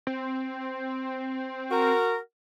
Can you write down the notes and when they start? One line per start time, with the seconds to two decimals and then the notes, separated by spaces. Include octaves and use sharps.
0.07 C4
1.71 F#4 A#4